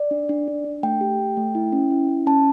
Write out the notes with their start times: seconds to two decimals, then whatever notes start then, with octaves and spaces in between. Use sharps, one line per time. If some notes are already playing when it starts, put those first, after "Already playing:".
Already playing: D5
0.11 D4
0.29 D4
0.48 D4
0.65 D4
0.83 A3 G5
1.01 G4
1.19 A3
1.37 A3
1.55 E4
1.72 C#4
1.91 E4
2.09 C#4
2.27 C#4 A5